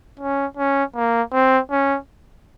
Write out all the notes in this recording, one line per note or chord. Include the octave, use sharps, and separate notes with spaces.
C#4
C#4
A#3
C4
C#4